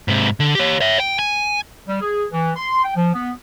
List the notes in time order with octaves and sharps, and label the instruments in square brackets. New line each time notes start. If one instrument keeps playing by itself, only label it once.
[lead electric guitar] G#2 C3
D3
G4 C#5
C#5 E5
G5
G#5
[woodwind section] G3
G#4
E3
C6
G5
F3
B3